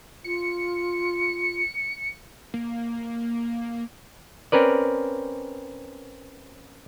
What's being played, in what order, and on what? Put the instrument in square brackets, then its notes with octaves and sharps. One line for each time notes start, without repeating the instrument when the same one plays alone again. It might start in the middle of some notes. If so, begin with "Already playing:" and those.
[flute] F4 [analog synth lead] C#7
[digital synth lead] A#3
[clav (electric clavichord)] C4 C#4 A#4 B4 D5